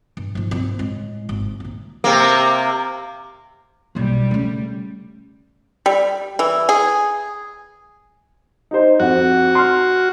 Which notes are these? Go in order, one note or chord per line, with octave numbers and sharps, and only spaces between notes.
G2
G#2 F3
G#2 C4
A2 G#3
G#1
A#1 D#3
C3 A#3
B1 G3 A#3
C#3 A3
G3
E3
G#4
D#4 G4 C5
F2 F#4 F#5
C6 F6